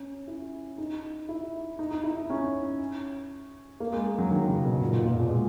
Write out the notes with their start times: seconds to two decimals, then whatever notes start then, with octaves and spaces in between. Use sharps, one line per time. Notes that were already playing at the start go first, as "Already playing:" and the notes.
Already playing: C#4
0.27 E4
0.78 D#4
1.29 E4
1.79 D#4
1.91 D#4
2.04 E4
2.17 D#4
2.30 C#4
3.80 A#3
3.92 G#3
4.05 G#3
4.18 F#3
4.31 D#3
4.48 C#3
4.65 B2
4.81 A#2
4.93 A#2
5.06 A#2
5.19 B2
5.31 G#3